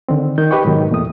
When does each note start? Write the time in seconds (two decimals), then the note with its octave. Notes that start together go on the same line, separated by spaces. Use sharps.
0.09 D3 D#3 C4
0.38 D#3 G6
0.51 D#4 G4 B4 D#5 G5 C#6
0.65 G#2 B2 D#3 F#3
0.91 E2 A#2 A3 D#6